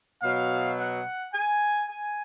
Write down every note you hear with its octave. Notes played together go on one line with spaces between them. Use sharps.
B2 F#3 F5
F#5
G#5
G#5